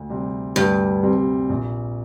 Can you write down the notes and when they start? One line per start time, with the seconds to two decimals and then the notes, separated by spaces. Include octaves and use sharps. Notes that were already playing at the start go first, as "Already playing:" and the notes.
Already playing: D2
0.10 C3 G3 C4
0.56 D2 G2
1.03 C3 G3 C4
1.50 A#1